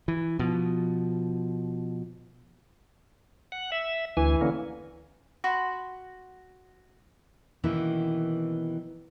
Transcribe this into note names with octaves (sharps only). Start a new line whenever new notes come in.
E3
B2 F3
F#5
E5
D2 E3 G#5
D3 A#3 C#4
F#4 B5 C6
B2 D#3 E3 A#3 C#4 E4